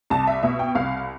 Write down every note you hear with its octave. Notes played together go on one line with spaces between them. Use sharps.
C2 A5
E5
B2 E5
G5
C2 F5